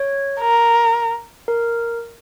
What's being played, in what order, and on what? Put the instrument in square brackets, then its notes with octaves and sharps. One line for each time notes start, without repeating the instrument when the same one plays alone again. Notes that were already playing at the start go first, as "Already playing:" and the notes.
Already playing: [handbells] C#5
[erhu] A#4
[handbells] A#4